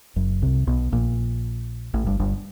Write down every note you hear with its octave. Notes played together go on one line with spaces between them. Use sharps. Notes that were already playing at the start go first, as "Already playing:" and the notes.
F#1 F#2
C2 C3
B1 B2
A#1 A#2
A1 A2
G1 G2
G1 G2